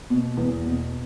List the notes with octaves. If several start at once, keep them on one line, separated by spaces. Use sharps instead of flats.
B2
E2
B2